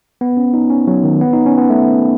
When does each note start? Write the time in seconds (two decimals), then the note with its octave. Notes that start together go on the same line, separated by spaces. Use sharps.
0.21 B3
0.37 C#4
0.54 D#4
0.70 C#4
0.87 F#3
1.04 D#3
1.21 B3
1.33 D#4
1.46 C#4
1.58 B3
1.70 A3